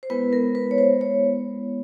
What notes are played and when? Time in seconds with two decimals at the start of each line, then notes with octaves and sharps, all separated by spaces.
0.03 C5
0.10 G#3 B3 E4 B4
0.33 A#4
0.55 B4
0.71 C#5
0.78 C5
1.01 C#5